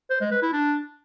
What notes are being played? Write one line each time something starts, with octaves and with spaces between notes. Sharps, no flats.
C5
G#3
B4
E4
D4